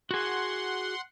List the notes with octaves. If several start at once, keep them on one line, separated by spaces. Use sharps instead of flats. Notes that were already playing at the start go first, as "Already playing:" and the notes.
F#4 G#4 F#5 C6